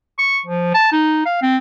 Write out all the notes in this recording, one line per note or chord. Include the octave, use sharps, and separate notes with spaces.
C#6
F3
A5
D#4
F5
C4